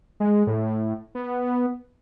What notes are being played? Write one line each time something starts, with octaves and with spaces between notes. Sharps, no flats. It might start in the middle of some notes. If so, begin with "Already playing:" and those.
G#3
A2
B3